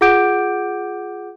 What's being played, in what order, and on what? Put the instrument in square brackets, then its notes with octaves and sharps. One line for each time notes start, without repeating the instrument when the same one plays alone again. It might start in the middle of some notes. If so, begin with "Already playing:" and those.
[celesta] F4 G#4 F#5 D6 G6 D7